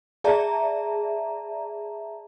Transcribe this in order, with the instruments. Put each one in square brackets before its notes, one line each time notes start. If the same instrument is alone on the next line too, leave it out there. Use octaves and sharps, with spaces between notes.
[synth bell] G#4 D5 E5 A5 A#5